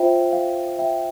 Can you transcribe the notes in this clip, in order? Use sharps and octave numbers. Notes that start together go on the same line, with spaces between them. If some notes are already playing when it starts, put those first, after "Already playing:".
Already playing: F4 C5 E5 G5
F5
E5 G5